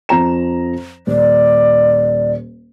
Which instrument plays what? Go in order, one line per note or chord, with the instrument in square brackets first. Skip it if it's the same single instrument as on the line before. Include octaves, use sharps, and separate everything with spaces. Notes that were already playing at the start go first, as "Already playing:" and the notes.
[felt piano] F2 A#5 E7
[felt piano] D#1 [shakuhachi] D5